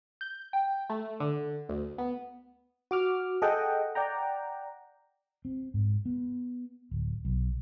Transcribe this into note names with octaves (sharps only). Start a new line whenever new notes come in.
G6
G5
A3
D3
D2
B3
F#4 D6 F6
G#4 A4 D#5 F#5 G5
D5 F#5 G5 A#5
C4
G#2
B3
D1
B1